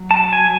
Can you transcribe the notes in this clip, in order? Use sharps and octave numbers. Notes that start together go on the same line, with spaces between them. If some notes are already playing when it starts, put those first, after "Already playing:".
Already playing: F#3
A5
G#5